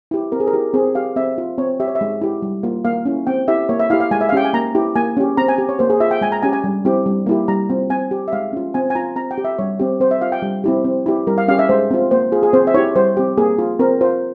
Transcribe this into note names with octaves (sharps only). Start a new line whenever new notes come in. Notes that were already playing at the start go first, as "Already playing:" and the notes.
E4 G4
C4 A#4
G#4
A#4
E4 G4
C4 G#4
G4 F5
C4 E5
F4
C4 C#5
G4 E5
C#5
E5
G#3
E4 G4
G3
A#3 F4
A#3 F5
C#4 E4
C4 G5
E4 G4 E5
A#3 C#5
E5
E4 G4 F5
F5
G#3 G#5
E5
F5
C#4 G4 G5
G#5
A#3 A#5
E4 G4
A#3 G#5
C#4 G4
C4 A#5
G#5
G4
C#5
A#3 C5
G#4
F4 E5
G5
G#3 G#5
A#5
C#4 G4 G#5
G#5
G3
C4 E4 G4
G3
A#3 E4 G4
G3 A#5
C4 F4
C4 G#5
G4
E5
G#3 F5
C#4 F4
C4 G#5
G#5
F4 A#5
C4 A#5
G5
G4
E5
G3 C#5
C4 G4
C4 C5
E5
F4 F5
G5
G3
C4 E4 G4
C4
E4 G4
G3 A#4
F5
C#4 G4 F5
E5
G#3 C5
C4 F4
A#3 C5
F4 G#4
G#4
C4 C5
E5
E4 G4 C#5
G3 C5
C4 G4
A#3 G#4
F4
C4 A#4
F4 C5